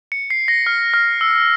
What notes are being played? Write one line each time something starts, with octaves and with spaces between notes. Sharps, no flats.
C#7
C7
A#6
F6
F6
E6